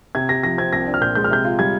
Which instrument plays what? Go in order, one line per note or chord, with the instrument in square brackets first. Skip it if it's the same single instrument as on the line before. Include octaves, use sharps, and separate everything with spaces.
[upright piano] C3 [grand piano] G#6
[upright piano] G4 [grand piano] A#6
[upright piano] F3 [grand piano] A#6
[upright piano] C4 [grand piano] G#6
[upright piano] C2 [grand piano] A#6
[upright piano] D4
[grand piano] F6
[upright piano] A#2 [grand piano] G6
[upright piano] G#3 [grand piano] G6
[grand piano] F6
[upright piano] C3 [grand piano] G6
[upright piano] F4
[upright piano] G3 [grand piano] G#6